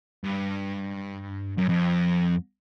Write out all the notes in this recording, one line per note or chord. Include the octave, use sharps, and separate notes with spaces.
G2
F#2
F2